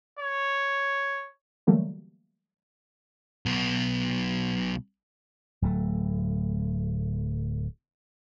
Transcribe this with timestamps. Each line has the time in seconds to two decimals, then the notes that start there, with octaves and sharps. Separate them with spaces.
0.19 C#5
1.67 D3 E3 F#3 G3 A3 A#3
3.46 B1 B2
5.62 D1 F#3 A3